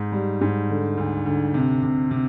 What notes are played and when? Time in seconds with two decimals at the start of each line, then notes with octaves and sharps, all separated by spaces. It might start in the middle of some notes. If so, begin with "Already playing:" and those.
Already playing: G#2
0.12 G3
0.41 G#2
0.70 D3
0.98 D2
1.26 D2
1.54 C3
1.83 C3
2.11 C3